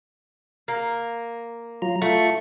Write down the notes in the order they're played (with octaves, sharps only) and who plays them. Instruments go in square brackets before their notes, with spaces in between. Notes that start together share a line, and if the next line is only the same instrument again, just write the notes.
[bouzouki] A#3
[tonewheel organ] F#3 F4 A#5
[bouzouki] A3 [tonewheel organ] F4 C#6